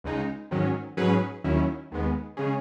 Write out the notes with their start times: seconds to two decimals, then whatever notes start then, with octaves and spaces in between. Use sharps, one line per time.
0.04 C#2 C#3 G#3 D#4
0.51 G#2 D#3 F#3 C#4
0.97 G#2 F#3 C#4 G#4 B4
1.44 D#2 D#3 F#3 C#4 E4
1.91 D#2 D#3 G#3 B3
2.37 C#3 G#3 C#4 G#4